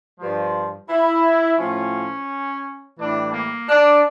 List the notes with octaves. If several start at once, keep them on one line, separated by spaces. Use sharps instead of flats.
G2 F3
E4
A2 F3 C#4
A2 E3 G3 D4
A#3
D4